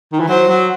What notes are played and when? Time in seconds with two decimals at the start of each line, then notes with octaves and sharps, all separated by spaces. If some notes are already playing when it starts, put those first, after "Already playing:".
0.12 D#3
0.20 E3
0.28 F#3 C5
0.49 F#3